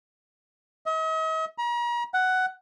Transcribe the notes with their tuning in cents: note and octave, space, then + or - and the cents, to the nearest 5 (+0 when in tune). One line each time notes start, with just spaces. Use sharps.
D#5 +45
A#5 +40
F#5 +10